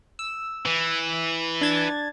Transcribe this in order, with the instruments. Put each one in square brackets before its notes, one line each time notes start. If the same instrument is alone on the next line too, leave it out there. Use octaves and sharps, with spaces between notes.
[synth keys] E6
[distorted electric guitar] E3
[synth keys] D4 G#6 A6